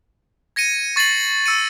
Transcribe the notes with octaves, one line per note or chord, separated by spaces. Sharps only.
G#6 A#6 C#7 D#7
C#6 A6 C7 D#7 F#7
E6 C#7 D#7